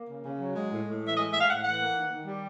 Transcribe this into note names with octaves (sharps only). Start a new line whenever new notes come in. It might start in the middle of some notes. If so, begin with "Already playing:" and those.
Already playing: A#3
C#3
C#3
F#3
G#3
A2
A2
E3
E5
G#3 D#5
A2 E5
F5
A2 F#5
E3 F#5
A#3
D#3
D#3
G3